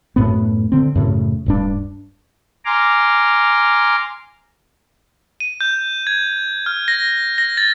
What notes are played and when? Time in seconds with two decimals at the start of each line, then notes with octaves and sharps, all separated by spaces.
0.16 F#2 A2 B3
0.72 D3 C4
0.95 F#2 A2 C#3
1.46 D1 G2 D4
2.65 G#5 A#5 C6 D6 F6
5.40 D#7
5.61 G6
6.07 G#6
6.66 F6
6.88 A#6
7.38 A#6
7.57 A6